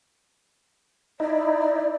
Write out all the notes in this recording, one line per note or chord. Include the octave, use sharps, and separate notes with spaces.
D#4 E4 D5